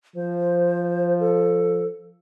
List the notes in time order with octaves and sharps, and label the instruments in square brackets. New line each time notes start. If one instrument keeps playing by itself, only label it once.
[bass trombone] F3 [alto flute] C5
[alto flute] A4